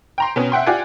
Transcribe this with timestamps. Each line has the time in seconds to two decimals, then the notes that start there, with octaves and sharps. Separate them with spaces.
0.18 G5 A#5 C6
0.36 B2 B3 C#4
0.52 E5 F#5 G5 C6
0.66 F4 G4 D5 F#5 G#5